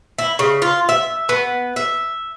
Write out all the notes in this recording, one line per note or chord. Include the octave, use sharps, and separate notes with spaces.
E4
C#3
F4
E5
B3
E5